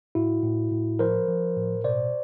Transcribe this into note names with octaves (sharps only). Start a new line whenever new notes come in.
A2 E4 F#4
A2
A2
F3 A#4 C5
F3
A2
B2 C5 D5